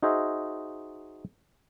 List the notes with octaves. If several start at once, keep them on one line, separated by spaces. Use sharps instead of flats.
D#4 F#4 G#4 C5 D#5 E5